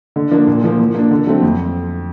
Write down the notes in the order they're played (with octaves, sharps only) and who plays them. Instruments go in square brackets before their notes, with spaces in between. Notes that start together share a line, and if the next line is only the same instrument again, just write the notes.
[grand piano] D3
F3 A#3 D4
A#2
F3 A#3
F3
A#3 D4
D3
F#3 A3 C4
F2